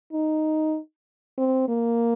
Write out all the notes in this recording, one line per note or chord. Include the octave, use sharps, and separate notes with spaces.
D#4
C4
A#3